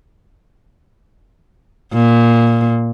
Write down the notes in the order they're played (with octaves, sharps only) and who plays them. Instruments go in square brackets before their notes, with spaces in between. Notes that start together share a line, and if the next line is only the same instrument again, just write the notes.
[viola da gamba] A#2